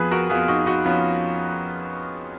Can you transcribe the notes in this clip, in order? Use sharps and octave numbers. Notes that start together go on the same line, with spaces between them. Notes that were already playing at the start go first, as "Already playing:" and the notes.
Already playing: F2 F3 B3 G#4 B4
F#4 A#4
F2 F3 B3 F4 G#4
D#4 F#4
D#4 F#4
F2 F3 B3 C#4 F4